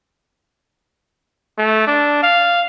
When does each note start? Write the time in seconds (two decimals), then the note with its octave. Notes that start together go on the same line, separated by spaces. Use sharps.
1.58 A3
1.87 D4
2.23 F5